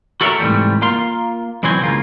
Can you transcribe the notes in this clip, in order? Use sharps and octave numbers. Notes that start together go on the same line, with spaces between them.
F#4 A4 A#4 C#5 D#5 E5
G#2 C3 E3 G3 A3
A#3 F4 F5 C6
B1 E3 F#3 C4 C5 G#5
C#2 C#3 A#3 F4